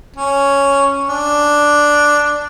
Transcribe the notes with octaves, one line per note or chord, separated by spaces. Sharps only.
C#4
D4